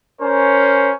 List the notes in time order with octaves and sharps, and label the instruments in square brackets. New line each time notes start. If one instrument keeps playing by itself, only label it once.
[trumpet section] C#4 A#4 C5